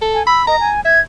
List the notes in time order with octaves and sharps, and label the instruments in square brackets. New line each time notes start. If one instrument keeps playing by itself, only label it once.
[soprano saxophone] A4
[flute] G#5
[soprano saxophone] B5 [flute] E6
[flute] D#5 [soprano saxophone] A#5
[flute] G#5
[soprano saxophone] E5 [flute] G#6